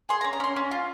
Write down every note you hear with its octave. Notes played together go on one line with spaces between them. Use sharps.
G#4 C6
A#5
C#4
A#5
C#4 C6
C#4
F4